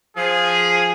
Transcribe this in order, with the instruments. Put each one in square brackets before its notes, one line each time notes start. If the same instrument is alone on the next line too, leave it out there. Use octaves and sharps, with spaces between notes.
[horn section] F3 [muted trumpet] G#4